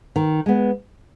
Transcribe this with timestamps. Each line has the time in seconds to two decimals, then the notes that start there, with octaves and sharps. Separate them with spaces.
0.16 D#3
0.46 G#3 B3